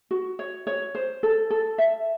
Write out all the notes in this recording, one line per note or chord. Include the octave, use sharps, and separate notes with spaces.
F#4
C#5
C#5
C5
A4
A4
E5